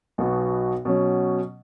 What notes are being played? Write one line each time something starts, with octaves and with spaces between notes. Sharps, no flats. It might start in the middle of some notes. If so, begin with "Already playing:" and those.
B1 B2 B3 F#4
B2 F#3 C#4